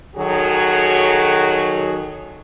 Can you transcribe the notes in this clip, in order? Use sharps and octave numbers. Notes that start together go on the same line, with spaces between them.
D#3 F#3 F#4 G#4 A4 C#5